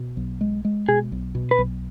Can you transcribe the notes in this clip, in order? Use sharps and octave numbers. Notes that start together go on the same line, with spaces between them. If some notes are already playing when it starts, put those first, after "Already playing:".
Already playing: B2
B1
G#3
G#3
B2 G#4
B1
B2
B4
B1